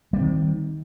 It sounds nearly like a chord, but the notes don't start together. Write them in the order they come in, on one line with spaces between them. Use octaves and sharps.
G3 A#3 C4 D#3